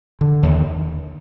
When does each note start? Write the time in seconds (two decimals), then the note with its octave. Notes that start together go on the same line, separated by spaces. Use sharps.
0.21 D3
0.43 D#2